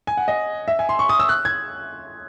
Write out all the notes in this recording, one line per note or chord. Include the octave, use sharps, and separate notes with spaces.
G#5
F#5
D#5
E5
G#5
C6
C#6
D#6
E6
F#6
G#6